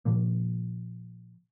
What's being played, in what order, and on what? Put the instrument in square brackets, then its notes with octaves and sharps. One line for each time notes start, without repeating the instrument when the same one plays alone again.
[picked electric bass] A#2 C#3 F3 A#3